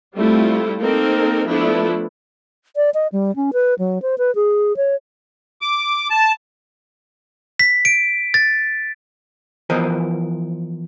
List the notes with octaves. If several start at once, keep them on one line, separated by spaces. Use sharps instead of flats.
G3 A3 C4 E4 F4
A#3 C4 D#4 A4 A#4
F3 A3 B3 D4 E4
D5
D#5
G3
C#4
B4
F#3
C5
B4
G#4
C#5
D6
A5
B6
D7
A6
E3 F3 B3 A#4 C5 D#5